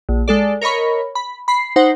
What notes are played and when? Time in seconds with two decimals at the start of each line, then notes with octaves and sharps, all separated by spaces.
0.09 A#1
0.28 G#3 A4 D5
0.62 A#4 C#5 D#5 B5 C#6
1.15 B5
1.48 B5 C7
1.76 D#4 C5 F#5